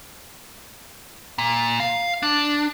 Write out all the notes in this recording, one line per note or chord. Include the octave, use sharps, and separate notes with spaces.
A#2
F5
D4